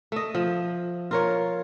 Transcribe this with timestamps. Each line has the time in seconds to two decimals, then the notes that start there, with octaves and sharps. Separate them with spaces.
0.12 A3 D#5
0.35 F3
1.11 F4 A#4 C#5